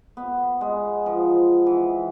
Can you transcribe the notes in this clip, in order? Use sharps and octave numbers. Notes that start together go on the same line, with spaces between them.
B3
G#3
F3
E3